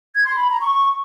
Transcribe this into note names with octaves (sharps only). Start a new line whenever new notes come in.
G#6
C6
B5
A#5
C#6